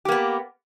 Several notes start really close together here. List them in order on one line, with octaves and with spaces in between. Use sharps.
G4 A#3 B3